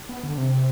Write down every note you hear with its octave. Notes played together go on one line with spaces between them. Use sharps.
B3
D3
C3